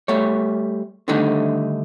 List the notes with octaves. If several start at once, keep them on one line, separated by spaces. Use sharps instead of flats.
G3 A3 C#5
D3 D#3 G3 A3 D4 D#4